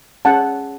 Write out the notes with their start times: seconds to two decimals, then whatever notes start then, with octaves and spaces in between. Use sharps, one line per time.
0.25 C#4 G#4 C#5 F#5 A5